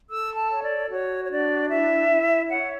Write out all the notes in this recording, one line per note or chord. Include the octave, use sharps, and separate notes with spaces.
A4 E6
A5
C#5
D5
F#4 C#5
C#5
D4 D5
E4 E5
E4
C#5 F#5